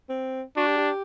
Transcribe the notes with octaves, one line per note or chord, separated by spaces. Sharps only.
C4
D4 F#4
G4
G4